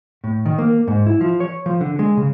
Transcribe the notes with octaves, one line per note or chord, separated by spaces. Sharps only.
A2
D#3
A#3
G#2
E4
F3
C#5
F3
D3
G#3
C#3